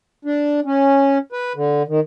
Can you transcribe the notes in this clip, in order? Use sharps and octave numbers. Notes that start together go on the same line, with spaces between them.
D4
C#4
B4
D3
D#3